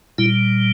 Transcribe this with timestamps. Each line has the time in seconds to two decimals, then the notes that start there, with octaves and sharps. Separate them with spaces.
0.18 A#2 G3 E4